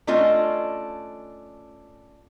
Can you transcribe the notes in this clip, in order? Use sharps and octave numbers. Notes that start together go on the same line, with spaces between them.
A3 C#4 D4 F4 D#5